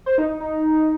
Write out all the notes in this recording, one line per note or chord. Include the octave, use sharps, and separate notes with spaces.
C5
D#4
D#4
D#4